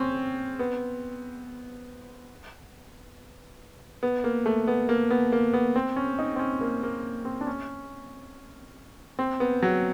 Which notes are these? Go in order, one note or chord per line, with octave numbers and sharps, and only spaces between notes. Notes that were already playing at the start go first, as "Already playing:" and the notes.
Already playing: C4 C#4
B3
B3
A#3
A3
B3
A#3
B3
A#3
B3
C4
C#4
D#4
C4
C#4
A#3
A#3
C4
D4
C#4
C4
B3
F#3